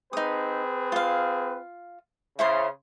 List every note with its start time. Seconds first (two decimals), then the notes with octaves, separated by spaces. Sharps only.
0.13 C4 D#4 G#4 B4 D#6
0.92 F4 F5
2.39 C#3 E4 C5 C6